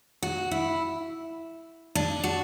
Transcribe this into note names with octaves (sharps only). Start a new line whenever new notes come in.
F#4
E4
D4
F#4